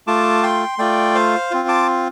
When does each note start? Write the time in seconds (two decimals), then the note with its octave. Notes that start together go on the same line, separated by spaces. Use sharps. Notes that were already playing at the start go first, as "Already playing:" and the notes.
0.07 A3 F4 A5 D6
0.43 G5 C6
0.78 A3 F4 D5 G5
1.15 C5 F5
1.51 C4 F4
1.68 A5 D6